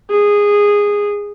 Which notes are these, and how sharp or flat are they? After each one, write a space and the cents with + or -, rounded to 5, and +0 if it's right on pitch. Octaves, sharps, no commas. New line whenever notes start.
G#4 -15